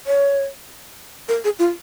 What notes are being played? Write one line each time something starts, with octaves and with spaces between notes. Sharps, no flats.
C#5
A#4
G#4
F4